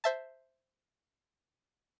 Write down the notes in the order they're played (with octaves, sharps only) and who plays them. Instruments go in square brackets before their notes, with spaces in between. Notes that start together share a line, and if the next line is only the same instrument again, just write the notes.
[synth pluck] C5 E5 A5